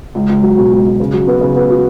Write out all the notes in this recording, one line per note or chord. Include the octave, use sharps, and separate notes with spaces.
C#2
C#2
F#3
B2
C#2
C#2
C#3
F#3
B3
C#3
B3
F#4